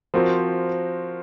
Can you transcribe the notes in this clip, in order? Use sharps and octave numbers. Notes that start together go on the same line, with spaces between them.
F3 C4 F#4 A#4